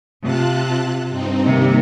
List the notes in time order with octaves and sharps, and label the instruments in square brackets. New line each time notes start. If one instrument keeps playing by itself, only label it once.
[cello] C3 [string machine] F4 A5 F#6
[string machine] G2 C4 D#4
[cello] C3 [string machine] D#3 G3 A#3